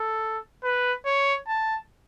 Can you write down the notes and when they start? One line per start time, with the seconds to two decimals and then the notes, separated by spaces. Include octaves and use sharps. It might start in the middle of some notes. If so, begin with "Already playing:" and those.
Already playing: A4
0.64 B4
1.06 C#5
1.48 A5